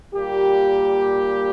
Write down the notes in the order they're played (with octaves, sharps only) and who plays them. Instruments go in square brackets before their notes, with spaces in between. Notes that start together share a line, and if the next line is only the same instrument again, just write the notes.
[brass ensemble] A#2 G3 A#3 G4